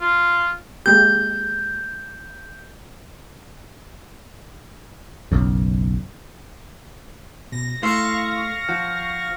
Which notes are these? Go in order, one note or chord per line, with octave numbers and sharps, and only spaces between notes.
F4
G#3 A#3 G4 G6
F#1 B1 F#2
B2 A#6
A3 E4 F5 C6 C#6 E6 A#6
F3 F#5